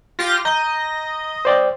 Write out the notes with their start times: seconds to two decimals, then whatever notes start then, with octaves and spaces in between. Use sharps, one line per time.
0.19 F4 G4 A#6
0.45 D#5 A#5 G6
1.45 C5 D5 G5